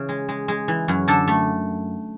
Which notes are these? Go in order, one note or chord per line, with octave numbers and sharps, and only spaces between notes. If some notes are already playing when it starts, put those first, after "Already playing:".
Already playing: C#3 E3
G#3
G#3
G#3
E3
F#2
D3 A4
A3